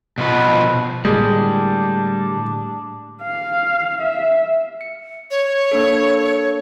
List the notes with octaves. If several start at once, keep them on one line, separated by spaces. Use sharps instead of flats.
B2 F3 B4
A2 D3 G3 G#3 A#3 D4
F5
E5
C#7
C#5
A#3 D4 A4